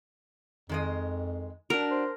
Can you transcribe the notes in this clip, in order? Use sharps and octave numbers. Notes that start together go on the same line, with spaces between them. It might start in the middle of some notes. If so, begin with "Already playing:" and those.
F2 D#3 G#3 D#5
D4 F#4 A#4
C5